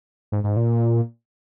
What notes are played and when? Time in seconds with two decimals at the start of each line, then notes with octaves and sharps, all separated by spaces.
0.32 G#2
0.44 G#2
0.57 A#2